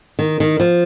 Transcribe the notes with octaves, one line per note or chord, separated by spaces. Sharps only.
D#3
D#3
F3